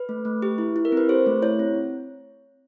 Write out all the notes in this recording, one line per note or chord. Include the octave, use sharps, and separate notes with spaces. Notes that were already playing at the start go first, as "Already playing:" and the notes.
Already playing: B4
A3
A3
G4
E4
E4
A#4
C4
B4
G4 C5
A3
E4 C#5
C4